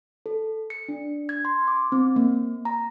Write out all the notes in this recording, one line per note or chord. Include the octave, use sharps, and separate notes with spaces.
A4
C#7
D4
G#6
C6
D6
C4
A#3
A#5